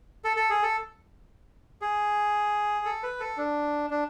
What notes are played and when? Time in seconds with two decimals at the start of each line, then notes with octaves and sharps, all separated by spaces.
0.24 A4
0.37 A4
0.50 G#4
0.63 A4
1.81 G#4
2.85 A4
3.03 B4
3.20 A4
3.37 D4
3.90 D4